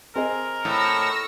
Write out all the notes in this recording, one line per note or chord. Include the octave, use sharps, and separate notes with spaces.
C4 G#4 A#4 D#5
A2 C#6 E6 A#6